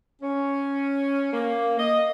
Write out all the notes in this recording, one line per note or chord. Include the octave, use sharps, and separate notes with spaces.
C#4
A#3
D#5